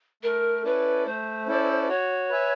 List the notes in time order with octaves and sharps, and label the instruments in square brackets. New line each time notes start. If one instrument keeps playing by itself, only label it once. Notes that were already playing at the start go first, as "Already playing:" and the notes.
[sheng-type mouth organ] A3 [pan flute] A#4
[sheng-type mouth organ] C#4 E4 A4 D5 [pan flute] B4
[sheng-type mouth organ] A3 [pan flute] C5
[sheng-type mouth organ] C#4 E4 A4 D5
[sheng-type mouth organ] F#4 [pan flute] C#5
[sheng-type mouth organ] B4 E5 G#5